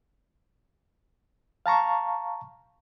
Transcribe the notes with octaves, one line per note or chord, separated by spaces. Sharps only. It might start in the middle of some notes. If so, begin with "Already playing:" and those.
F5 A5 A#5 C#6